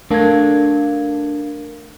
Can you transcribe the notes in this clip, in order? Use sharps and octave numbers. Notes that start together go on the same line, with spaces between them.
A3 D4 A#4 F5 A5 G#6